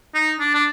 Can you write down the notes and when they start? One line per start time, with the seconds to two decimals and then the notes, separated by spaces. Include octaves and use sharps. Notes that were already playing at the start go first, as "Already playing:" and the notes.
0.14 D#4
0.40 D4
0.55 D4